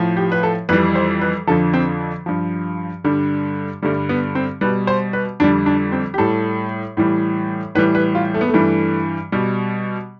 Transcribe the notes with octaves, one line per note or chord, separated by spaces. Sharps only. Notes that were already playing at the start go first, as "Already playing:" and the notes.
Already playing: A2 F3
G4
B4
A4
F2 E3 G3 B4
C5
B4
F2 D3 F3 A4
C4
G2 F3
G2 D3 G3
G2 D3 G3 A3
B3
C4
B2 G3 B4
C5
B4
F2 D3 G3 D4
D4
C4
G4
A2 G3 A4
A2 E3 G3
A2 E3 G3 B4
B4
F4
A3
B3
A3
G2 E3 G3
B2 G3